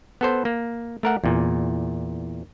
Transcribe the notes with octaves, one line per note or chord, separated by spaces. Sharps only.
B3 A4 C5
A#3
A3 A#4 F#5
E2 A#2